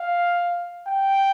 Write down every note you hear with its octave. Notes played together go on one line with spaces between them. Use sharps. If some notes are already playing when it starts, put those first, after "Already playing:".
Already playing: F5
G5